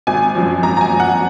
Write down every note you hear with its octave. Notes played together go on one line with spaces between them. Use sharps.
G#1 G#5
F#2 F3
G#1 A#5
A#5
G#5
F#2 F3
F#5